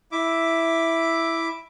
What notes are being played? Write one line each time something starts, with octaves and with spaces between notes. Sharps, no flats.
E4 E5 D6